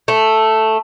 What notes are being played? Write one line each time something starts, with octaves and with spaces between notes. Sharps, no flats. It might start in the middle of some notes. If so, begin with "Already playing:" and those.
A3